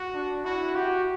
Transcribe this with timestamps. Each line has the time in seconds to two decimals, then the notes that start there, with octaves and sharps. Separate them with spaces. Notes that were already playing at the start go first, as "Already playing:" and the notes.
Already playing: F#4
0.14 D4
0.45 E4 F#4
0.75 F#4 G4